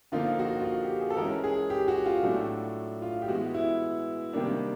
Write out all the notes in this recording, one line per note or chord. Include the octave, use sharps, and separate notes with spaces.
D3 F3 A#3 D#4 F4
F#4
F4
F#4
G4
G#4
A4
E3 G#3 C#4 A#4
G#4
G4
F#4
F4
A2 F#3 A3 D4
F4
G4
E3 G#3 B3 F#4
E4
C3 D#3 G3 A#3 D4